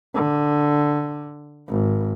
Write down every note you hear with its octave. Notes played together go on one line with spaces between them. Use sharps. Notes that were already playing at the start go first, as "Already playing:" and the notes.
D3
G#1